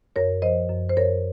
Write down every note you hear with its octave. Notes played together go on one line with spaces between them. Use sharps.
F#2 A#4 C#5
F3 C5 D#5
F#2
C5
F#2 A#4 C#5